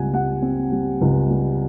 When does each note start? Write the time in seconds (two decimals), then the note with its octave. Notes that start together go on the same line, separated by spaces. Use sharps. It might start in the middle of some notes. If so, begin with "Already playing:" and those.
Already playing: C#2 G3 C4 F#5 G#5
0.13 G3 F#5
0.42 C4
0.72 G3
1.01 C#2
1.31 G3